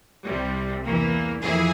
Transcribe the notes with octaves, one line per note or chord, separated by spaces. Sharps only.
C2 C3 G3
E2 E3 A#3
F2 E3 A#3 E4 G#4